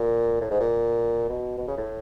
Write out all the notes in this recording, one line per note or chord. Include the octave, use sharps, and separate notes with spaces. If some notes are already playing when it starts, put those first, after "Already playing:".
Already playing: A#2
A2
G#2
A#2
B2
B2
C#3
A2